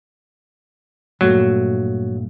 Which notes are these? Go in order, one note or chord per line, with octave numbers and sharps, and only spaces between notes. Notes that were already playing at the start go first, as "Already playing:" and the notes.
G2 A#2 F#3 A3